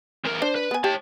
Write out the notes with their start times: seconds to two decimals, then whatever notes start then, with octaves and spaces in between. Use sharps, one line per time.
0.25 E2 A#4
0.42 D4 C5
0.55 B4
0.71 B3 G#5
0.84 G4 C#5 A5